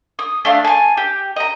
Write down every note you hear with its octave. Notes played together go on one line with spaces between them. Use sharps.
D#6
A3 D4 F5
G#5 A5
G4
D#5 A#5